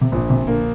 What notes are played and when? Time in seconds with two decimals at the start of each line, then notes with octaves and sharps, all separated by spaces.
0.01 C3
0.12 A#1 A#2
0.30 C3
0.48 D3 A#3